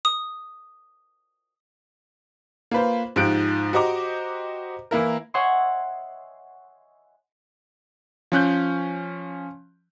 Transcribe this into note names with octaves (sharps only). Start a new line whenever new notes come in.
D#6
A#3 F4 B4 C5
G#2 F3 G4 F#6 D7
F#4 G4 C5 D#5 A#5 D6
E3 A#3 E4 A#4
C#5 D#5 E5 F#5 G#5 C6
F3 C#4 F#6 G6